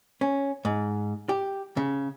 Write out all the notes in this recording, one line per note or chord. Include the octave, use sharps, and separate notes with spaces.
C#4
G#2
G4
C#3